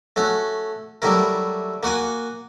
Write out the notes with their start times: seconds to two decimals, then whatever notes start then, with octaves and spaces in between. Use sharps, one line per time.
0.16 A3 C#4 F#4
1.02 F#3 G3 A3 E4 A#4
1.83 A#3 F#4 F#5 G#5